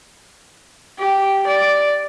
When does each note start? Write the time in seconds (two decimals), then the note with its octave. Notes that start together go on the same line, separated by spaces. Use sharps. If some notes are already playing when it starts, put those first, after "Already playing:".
0.99 G4
1.47 D5